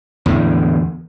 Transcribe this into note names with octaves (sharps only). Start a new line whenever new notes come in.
E2 A2 D3